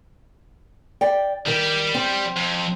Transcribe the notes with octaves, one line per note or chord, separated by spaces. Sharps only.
D5 G5
D#3 G3 G4
C4
F2